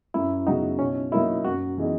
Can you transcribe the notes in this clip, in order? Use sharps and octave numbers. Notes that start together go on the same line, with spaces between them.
F#2 E4
C#3 F#3 B3 D#4 F#4
B2 C#4
F#3 A#3 D#4 E4
F#2 F#4
E3 G#3 B3 D#4